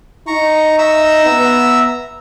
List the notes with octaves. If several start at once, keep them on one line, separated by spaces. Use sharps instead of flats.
D#4 A#5 C#6
E5 A#5 E6
B3